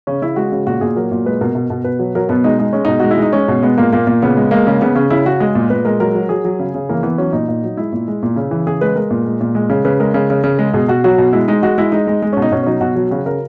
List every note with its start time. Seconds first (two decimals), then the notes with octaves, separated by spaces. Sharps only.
0.07 C#3 C#4
0.22 C#3 E4
0.36 G#3 F#4
0.52 C#3
0.67 A#2 F#4
0.81 A#2 G#4
0.96 F#3 A#4
1.12 A#2
1.26 G#3 B4
1.41 B2 A#4
1.55 B2
1.70 B2
1.84 B2 B4
1.99 F#3
2.15 F#3 A#4
2.29 B2 B3
2.44 G#3 D#4
2.59 G#3 D#4
2.73 G#3 C#4
2.85 B2 D#4
3.00 G#3 F#4
3.11 E4
3.18 G#3 D#4
3.33 G#3 C#4
3.48 B2
3.63 G#3 B3
3.78 A#2 A#3
3.92 A#2 A#3
4.07 A#2
4.22 C#3 B3
4.37 G#3
4.51 G#3 A#3
4.67 C#3
4.81 C#3 B3
4.96 C#3 C#4
5.10 C#3 E4
5.25 C#3 F#4
5.40 G#3 G#4
5.55 A#2
5.70 A#2 B4
5.85 G#3 A#4
6.00 F#3 A#4
6.15 F#3
6.29 F#3 G#4
6.45 F#3
6.60 C#3
6.75 C#3
6.89 E3 A#3
7.03 E3 B3
7.18 F#3 C#4
7.33 A#2 D#4
7.48 A#2
7.63 F#3
7.77 G#3 E4
7.92 A#2
8.08 G#3
8.23 A#2
8.36 C#3
8.51 E3
8.67 C#3 G#4
8.81 G#3 B4
8.96 G#3 A#4
9.11 A#2
9.26 G#3
9.41 A#2
9.55 G#3
9.70 C#3
9.85 C#3 B4
10.00 G#3 A#4
10.14 C#3
10.30 C#3
10.44 C#3
10.59 G#3
10.74 B2 G#4
10.88 B2 F#4
11.04 F#3 F#4
11.18 B2
11.33 G#3 E4
11.48 G#3 D#4
11.63 G#3 F#4
11.78 G#3 E4
11.92 G#3 D#4
12.07 G#3
12.22 G#3
12.33 B2 C#4
12.42 D#4
12.51 B2 C#4
12.63 C#4
12.66 F#3 D#4
12.81 B2 F#4
12.96 F#3
13.11 C#3 F#4
13.26 C#3 A#4